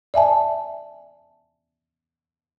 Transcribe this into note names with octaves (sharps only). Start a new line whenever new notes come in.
D5 E5 G#5 A5